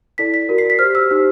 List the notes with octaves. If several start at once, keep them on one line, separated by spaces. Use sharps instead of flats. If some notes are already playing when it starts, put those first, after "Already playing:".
E4 A4 D5 B6
B6
F#4 A#4 D5
C7
B6
G4 C5 F6
E6
D#4 G4 C5